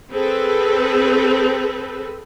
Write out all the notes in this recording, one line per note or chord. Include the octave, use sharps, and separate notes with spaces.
C4 G#4 A4 B4